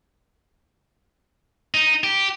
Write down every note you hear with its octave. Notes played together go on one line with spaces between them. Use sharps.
D#4
G4